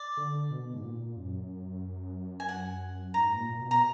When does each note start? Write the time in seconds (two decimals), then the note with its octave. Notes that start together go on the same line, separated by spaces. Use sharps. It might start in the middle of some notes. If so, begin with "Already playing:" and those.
Already playing: D5
0.17 D3
0.51 B2
0.74 G#2
0.83 A#2
1.17 F#2
2.40 G#5
2.49 F#5
3.14 G#2 A#5
3.36 A#2
3.49 A#2
3.59 B2
3.71 A#5